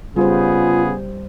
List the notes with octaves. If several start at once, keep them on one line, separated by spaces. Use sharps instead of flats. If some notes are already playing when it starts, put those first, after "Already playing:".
C#3 G3 B3 F4 G#4 C5